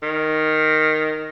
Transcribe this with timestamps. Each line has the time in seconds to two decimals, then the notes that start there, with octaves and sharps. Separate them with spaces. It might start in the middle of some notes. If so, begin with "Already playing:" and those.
0.03 D#3